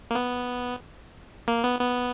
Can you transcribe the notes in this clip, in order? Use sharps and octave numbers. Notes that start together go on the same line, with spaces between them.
A#3
B3
A#3
B3
B3